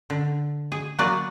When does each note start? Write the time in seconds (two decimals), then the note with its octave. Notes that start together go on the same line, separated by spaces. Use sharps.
0.10 D3
0.72 G#4
0.99 F#3 A#3 F#4 G#4 B4 D5